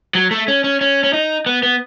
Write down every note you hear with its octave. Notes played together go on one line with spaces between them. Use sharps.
F#3
A3
C#4
C#4
C#4
C#4
D#4
B3
B3